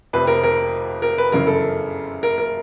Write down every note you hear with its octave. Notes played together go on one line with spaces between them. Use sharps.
F1 F2 C3 B4
A#4
A#4
A#4
B4
G1 F#2 C#3 E3 A#4
A4
A#4
A#4